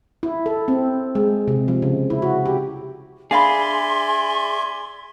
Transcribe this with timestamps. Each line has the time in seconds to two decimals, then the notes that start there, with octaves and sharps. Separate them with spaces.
0.23 E4
0.46 A4
0.68 C4
1.15 G#3
1.48 C3
1.68 F3
1.82 C#3
2.10 E4
2.22 F#4
2.46 G4
3.31 D4 G#4 D5 E5 F5 G#5 B5 C6